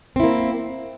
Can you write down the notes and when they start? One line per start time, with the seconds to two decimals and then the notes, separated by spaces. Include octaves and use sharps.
0.16 C4
0.20 E4
0.23 A#3